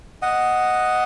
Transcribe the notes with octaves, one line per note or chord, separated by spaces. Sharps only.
D#5 F#5